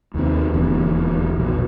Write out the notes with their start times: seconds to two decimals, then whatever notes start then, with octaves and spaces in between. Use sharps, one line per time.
0.14 D#2 C3 D#3 C4
0.53 D#1 E2 D3 D#3
1.36 A#1 B2